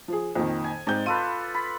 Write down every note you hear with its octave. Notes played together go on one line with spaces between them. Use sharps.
F3 G#4
F2 A#2 D#3
G#5
G#2 C4 D5 G6
F4 A4 B4 D#7
B5